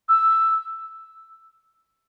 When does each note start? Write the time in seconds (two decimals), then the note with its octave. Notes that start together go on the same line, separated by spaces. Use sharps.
0.09 E6